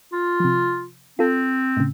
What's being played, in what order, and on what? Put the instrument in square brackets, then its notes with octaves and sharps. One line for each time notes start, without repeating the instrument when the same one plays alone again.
[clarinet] F4
[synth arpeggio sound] C3 F3
[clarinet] C4 [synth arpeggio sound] F4 A4
[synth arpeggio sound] A2 C#3